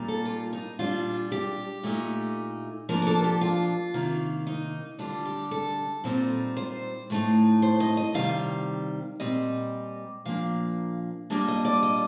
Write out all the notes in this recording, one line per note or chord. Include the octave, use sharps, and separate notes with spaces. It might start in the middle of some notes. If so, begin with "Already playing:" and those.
Already playing: A#2 G3 A#3 D#4
A4
F4
D#4
A#2 G3 D4 F4
G4
A#2 A3 D#4
F3 A#3 D4 A#4
A#4
A4
G4
F4
C3 D#3 A#3
D#4
D3 G3 D4 F4
G4
A4
A#2 G3 C4 D#4
C5
A2 A3 D#4
C5
D#5
D#5
C3 D#3 G3 F5
A#2 G3 C4 D#5
A#2 F3 A#3 D4 F5
A#2 G3 A#3 D4 D#5
D#5
D5
D#5